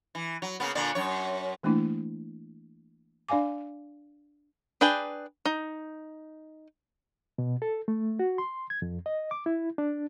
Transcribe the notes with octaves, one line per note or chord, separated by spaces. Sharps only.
E3
F#3
C#3 A#3 B3
A#2 D3 D4
F#2 C#5
E3 A3 A#3 D4 E4
D4 D5 F5 G#5 D6
D4 G#4 B4 G5
D#4
B2
A4
A3
F#4
C6
G#6
F2
D#5
D6
E4
D4